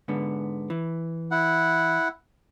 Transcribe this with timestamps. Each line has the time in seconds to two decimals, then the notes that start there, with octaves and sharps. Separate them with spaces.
0.08 G#2 D3 B3
0.70 E3
1.31 E4 F#5